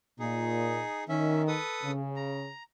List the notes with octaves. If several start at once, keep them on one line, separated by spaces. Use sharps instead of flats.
A#2 D#4 G#4
D#3 C#4 E5
A4 B4 D#6
C#3
A#5